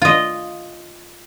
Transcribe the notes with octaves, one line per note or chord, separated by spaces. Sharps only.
F4 D#5